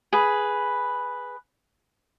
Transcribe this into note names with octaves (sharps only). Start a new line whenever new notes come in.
G#4 B4